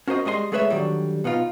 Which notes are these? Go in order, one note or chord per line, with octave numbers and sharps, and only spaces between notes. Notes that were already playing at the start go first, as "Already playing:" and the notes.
C#4 F#4 A#4 C5 D#5
G3 G#3 D#5 G#5 C6
G#3 A3 G#4 B4 C#5 E5
D3 D#3 F#3 G3
B2 B3 D#4 F4